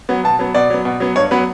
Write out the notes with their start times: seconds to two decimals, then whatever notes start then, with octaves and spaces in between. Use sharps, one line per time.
0.09 F#3 B3
0.24 B2 A5
0.39 F#3 B3
0.54 B2 D5
0.70 F#3 B3
0.85 B2
1.00 F#3 B3
1.16 G2 C#5
1.31 F#3 B3 B4